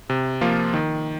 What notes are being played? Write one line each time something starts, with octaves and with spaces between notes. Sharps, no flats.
C3
F3 A#3 F4
D#3